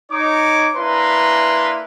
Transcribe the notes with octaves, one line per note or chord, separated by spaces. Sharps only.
D#4 C#5 D6
A#3 D4 E4 B4 A#5 C6